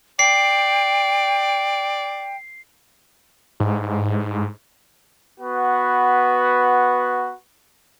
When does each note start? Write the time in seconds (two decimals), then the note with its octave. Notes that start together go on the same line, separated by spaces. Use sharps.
0.19 D5 G5 C7
3.60 G#2
5.39 B3 F#4 B4